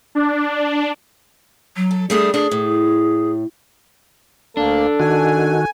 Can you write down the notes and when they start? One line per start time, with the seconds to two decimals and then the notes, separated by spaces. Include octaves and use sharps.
0.15 D4
1.77 F#3
1.91 A4
2.10 G3 A3 D4 G#4
2.34 D4 G#4
2.51 A2
4.57 D2 A#3 D4 A4
5.00 D#3 F#4 G#5